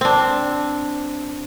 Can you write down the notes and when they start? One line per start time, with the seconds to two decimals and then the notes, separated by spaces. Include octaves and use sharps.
0.01 C4 D4